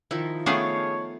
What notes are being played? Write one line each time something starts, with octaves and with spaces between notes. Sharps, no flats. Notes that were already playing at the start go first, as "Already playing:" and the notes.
D#3 F3 D#4 E4
A3 B3 D4 G#4 C#5 F5 G5